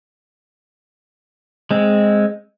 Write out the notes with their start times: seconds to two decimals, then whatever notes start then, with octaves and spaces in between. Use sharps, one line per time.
1.71 G#3 C4